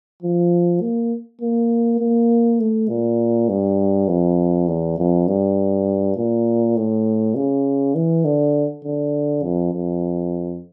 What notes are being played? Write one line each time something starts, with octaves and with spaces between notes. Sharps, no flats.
F3
A#3
A#3
A#3
A3
A#2
G2
F2
E2
F2
G2
A#2
A2
C#3
E3
D3
D3
F2
F2